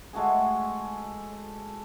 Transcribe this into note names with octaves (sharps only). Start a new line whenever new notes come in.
G#3 A3 F#4 G#4